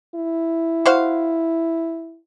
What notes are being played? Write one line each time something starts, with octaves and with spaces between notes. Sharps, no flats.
E4
F#4 C5 F5